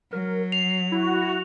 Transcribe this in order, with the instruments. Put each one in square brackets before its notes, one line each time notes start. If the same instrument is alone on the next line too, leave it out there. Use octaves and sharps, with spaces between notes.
[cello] F#3 [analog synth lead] A#4
[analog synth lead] C7 [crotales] F7
[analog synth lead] E4 [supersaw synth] F#4